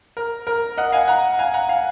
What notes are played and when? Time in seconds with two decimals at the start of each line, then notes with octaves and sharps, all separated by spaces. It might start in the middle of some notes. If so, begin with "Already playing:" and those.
0.17 A#4
0.47 A#4
0.77 D#5 F#5
0.92 F5 G#5
1.08 F#5 A#5
1.39 F5 G#5
1.54 F#5 A#5
1.68 F5 G#5